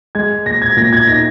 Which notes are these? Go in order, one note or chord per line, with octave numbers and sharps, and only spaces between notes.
G#3 G#6
A#2 A#6
G#6
A#2 A#6
G#6
D#4 A#6